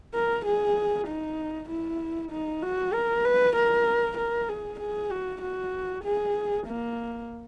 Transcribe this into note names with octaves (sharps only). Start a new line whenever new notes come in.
A#4
G#4
D#4
E4
D#4
F#4
A#4
B4
A#4
A#4
G#4
G#4
F#4
F#4
G#4
A#3